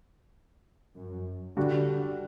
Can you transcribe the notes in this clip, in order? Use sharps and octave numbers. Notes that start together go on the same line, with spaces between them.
F#2
D3 G3 D4 F#4